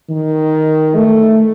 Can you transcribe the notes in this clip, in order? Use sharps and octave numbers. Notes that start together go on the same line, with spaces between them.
D#3
A3